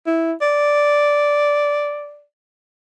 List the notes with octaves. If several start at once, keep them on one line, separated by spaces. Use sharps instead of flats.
E4
D5